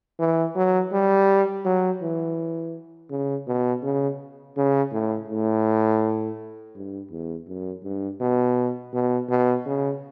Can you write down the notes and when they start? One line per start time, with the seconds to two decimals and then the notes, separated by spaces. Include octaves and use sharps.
0.20 E3
0.56 F#3
0.92 G3
1.65 F#3
2.02 E3
3.10 C#3
3.48 B2
3.83 C#3
4.57 C#3
4.92 A2
5.29 A2
6.75 G2
7.11 E2
7.47 F#2
7.83 G2
8.21 B2
8.93 B2
9.29 B2
9.66 C#3